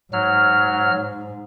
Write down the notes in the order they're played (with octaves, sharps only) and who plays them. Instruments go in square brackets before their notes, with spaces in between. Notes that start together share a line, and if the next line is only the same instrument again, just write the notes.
[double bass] G#2 [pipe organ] F#3 F6